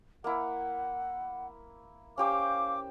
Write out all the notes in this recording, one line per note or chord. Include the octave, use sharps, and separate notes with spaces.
A#3 E4 F#5
C#4 G4 C5 F5 D6